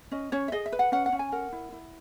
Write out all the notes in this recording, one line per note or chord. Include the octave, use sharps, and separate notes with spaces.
C#4 D#5
C#4 C#5
E5
G#4 D#5
E5
B4
F#5
C#4 F#5
F#5
C#4
G#5
A#4 F#5
E4
E4